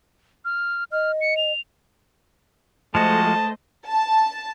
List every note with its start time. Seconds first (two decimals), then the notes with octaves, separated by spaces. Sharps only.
0.45 F6
0.92 D#5 F6
1.21 C#7
1.37 F7
2.95 F3 G#3 A3 F#4 C5 D#5 A5
3.87 A5